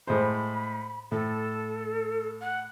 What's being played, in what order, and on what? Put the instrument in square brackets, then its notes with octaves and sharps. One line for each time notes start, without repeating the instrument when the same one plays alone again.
[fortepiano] A2 G#3 C5 [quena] B5
[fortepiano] A2 [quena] A4
[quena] F#5